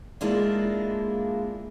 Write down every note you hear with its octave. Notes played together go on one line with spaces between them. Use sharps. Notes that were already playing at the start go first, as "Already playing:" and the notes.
G#3 A#3 D4 E4 F4